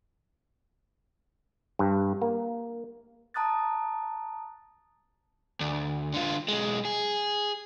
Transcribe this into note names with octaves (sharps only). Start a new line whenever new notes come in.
G2
A#3
A5 A#5 D#6 F#6 A6
D2
D3 F4
B1 G#3
G#4